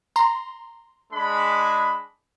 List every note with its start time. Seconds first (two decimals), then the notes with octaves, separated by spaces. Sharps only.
0.16 A#5 C6
1.12 G#3 D4 B5